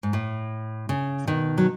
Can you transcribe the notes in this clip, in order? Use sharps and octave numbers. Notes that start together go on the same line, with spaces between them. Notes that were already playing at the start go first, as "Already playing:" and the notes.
G#2
A2
C#3
B2 D#3
F#3